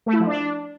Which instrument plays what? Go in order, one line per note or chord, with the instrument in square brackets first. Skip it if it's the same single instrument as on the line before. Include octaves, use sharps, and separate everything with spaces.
[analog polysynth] A3
E4
F3
D4